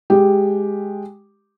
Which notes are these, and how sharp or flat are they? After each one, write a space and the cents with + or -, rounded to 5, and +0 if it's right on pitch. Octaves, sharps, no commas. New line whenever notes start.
G#3 +0 G4 +0